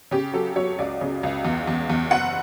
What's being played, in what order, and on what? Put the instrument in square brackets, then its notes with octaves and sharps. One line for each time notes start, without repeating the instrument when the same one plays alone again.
[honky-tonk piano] C#3 G4
F#3 A4
F#3 C#5
C#2 D5
C#3
C#2
E2
E2
E2
F#1 F#5